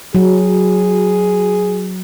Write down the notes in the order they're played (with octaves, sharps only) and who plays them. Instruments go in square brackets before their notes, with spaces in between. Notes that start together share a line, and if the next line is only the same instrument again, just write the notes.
[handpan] F#3 [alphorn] G#4